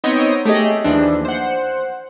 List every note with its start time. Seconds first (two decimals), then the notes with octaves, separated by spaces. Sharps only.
0.04 B3 C4 D#4 C#5 D#5 G5
0.45 A3 G4 G#4 D#5
0.84 D#2 E3 F3 D4
1.25 C5 F#5